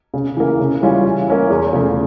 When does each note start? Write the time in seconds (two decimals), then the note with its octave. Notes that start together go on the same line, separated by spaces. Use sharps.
0.14 C#3
0.37 E3 A#3
0.60 C#3
0.82 E3 G3 C#4 F4
1.05 E3
1.28 A#3 C#4 E4
1.50 E2
1.73 C#3 F3 A3